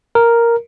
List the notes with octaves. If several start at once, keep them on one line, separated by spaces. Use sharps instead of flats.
A#4